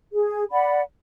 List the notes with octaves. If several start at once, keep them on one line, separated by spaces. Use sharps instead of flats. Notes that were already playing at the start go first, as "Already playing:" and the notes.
G#4
D5 F#5 B5